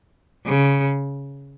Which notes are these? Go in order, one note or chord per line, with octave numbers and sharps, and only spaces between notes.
C#3